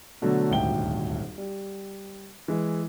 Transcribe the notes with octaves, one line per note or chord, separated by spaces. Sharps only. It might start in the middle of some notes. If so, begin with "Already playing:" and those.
B2 D3 F#3 A3
D#1 G#1 D2 E5 G5 G7
G3
E3 G#3